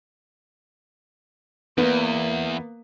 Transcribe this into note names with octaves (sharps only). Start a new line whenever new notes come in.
E2 A#3 B3